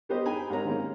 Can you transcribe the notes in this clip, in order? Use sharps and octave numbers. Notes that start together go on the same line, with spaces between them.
G3 B3 G4 B4 C5 D#5
D#4 G#4 G5 G#5 A#5 B5
G#2 G3 C4 A#4 C#5 A#5
D#3 G#3 A#3 C#4